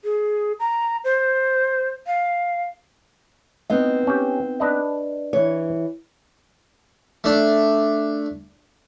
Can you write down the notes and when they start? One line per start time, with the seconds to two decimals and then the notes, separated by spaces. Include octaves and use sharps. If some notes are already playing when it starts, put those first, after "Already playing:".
0.04 G#4
0.59 A#5
1.04 C5
2.07 F5
3.70 B3 C4 D#4 D#5
4.07 C#4 G4
4.60 D4 B4 D#5
5.33 E3 C#5
7.24 A3 D4